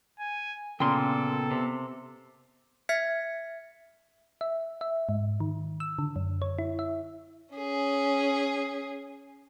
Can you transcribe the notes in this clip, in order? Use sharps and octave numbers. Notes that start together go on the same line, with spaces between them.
G#5
A#2 C#3 A#3 B3 A4 G5 C6
C3
E5 F6 G#6 B6 C#7
E5
E5
G#2
D#3
E6
D3
F#2
C#5
E4
E5
C#4 G#4